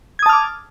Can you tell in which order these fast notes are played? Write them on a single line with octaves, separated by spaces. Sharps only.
G#6 D#6 A5 F6 D6